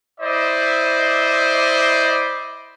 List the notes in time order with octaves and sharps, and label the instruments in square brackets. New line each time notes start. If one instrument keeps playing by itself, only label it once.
[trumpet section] E4 C5 D5 D#5